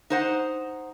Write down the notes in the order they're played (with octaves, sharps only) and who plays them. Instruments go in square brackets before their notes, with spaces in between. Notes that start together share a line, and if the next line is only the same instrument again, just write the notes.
[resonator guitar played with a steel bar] D#4 C5 F#5